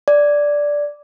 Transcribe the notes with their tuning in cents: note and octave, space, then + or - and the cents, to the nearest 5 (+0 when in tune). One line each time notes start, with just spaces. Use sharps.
D5 -5